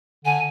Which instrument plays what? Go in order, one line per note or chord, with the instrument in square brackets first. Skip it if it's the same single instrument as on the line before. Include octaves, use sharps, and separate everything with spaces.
[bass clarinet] D3 [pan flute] G#5